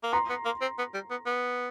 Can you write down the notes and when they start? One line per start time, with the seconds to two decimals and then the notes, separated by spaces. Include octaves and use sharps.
0.04 A#3
0.13 B3 A#5 C6
0.29 B3
0.45 A#3
0.62 C4
0.79 B3
0.94 G3
1.11 B3
1.26 B3